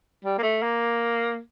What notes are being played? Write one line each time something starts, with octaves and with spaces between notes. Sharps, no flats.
G3
A#3
A3
A#3